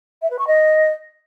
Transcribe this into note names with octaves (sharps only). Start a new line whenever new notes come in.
E5
B4
C#6
D#5